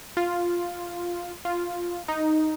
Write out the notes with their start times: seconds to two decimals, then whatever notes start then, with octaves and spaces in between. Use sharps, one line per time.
0.17 F4
1.45 F4
2.08 D#4